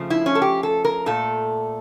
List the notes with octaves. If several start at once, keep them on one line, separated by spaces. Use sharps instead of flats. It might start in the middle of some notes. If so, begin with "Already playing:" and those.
Already playing: C#3 F3 A3
E4
C#4
A4
G4
A4
A#4
A#2 A3 A4